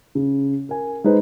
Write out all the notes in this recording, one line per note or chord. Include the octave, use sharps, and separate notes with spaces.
C#3
A#4 G#5
G#3 D#4 G#4 B4 C5